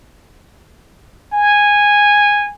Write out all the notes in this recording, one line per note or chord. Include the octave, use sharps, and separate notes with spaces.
G#5